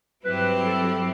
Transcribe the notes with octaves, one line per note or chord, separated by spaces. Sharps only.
G2 F#3 C4 E4 G4 B4
A4